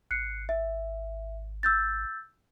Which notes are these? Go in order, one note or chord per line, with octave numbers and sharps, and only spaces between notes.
G#1 F#6 C7 C#7
E5
E6 G6 A6